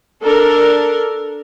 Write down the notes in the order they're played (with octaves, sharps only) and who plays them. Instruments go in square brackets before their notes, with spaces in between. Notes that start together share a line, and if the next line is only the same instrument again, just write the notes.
[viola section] D4 A4 A#4